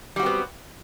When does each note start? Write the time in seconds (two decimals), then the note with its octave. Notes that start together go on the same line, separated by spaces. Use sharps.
0.16 G3
0.19 F#4
0.23 C4
0.26 B3